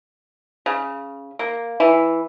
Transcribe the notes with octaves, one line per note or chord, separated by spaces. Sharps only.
C#3
A#3
E3